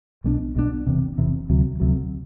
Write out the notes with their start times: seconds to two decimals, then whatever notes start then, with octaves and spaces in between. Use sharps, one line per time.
0.24 B1 B2 G3 D4
0.56 B1 B2 G3 D4
0.87 E1 E2 C3
1.18 E1 E2 C3
1.50 D2 C3 F#3
1.80 D2 C3 F#3